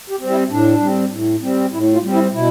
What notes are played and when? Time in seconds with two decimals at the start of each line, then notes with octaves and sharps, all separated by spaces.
0.10 G4
0.19 G3 C4
0.30 E4
0.50 A2 D4
0.80 G3 C4
1.11 A2
1.42 G3 C4
1.73 A2 E4
1.93 F4
2.03 G3 C4
2.14 E4
2.34 B2 E4